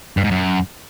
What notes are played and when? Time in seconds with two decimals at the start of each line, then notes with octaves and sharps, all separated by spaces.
0.17 G2
0.24 G#2
0.31 F#2